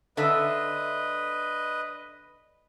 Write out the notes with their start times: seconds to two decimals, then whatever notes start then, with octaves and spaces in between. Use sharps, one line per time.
0.17 D3 A4 B4 D#5 E5